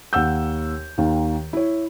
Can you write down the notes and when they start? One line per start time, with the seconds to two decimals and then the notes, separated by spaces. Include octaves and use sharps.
0.13 D#2 F#5 E6 G6
0.98 D#2 D#3
1.53 E4 C#5